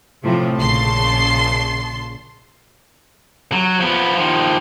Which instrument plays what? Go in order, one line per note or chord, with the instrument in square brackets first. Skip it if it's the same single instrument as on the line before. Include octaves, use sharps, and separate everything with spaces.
[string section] A2 C3 F3
A#1 C#3 A5 C6 C7
[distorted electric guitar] F#3
F3 B3
D#3 F3